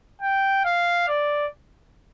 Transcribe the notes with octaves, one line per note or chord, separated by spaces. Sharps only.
G5
F5
D5